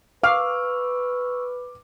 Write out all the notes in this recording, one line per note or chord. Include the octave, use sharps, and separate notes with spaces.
B4 F5 C#6 D6 E6 F6